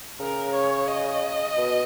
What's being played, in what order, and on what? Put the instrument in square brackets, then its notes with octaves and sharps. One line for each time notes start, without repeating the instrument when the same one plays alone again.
[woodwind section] C#3 [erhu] A#4
[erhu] C#5
D#5
[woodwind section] B2